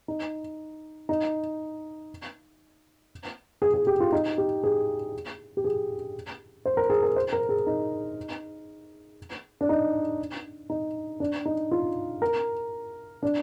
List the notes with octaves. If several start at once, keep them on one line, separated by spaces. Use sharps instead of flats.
D#4
D#4
G#4
G#4
G4
F4
D#4
G4
G#4
G4
G#4
C5
A#4
G#4
A#4
C5
A#4
G#4
D#4
D4
D#4
D#4
D4
D#4
F4
A#4
D4